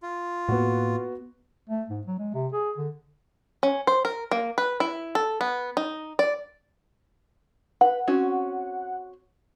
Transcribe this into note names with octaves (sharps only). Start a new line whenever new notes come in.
F4
A2 A#3 B3 F#4
A3
G#2
F#3
G#3
C3
G#4
D3
C#4
C5
A#4
A#3
B4
E4
A4
B3
D#4
D5
B4 F#5
C4 C#4 F#4